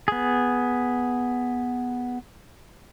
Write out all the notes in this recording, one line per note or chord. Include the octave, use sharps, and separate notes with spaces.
B3 G#4